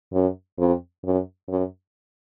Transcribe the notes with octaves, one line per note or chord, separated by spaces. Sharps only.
F#2
F2
F#2
F#2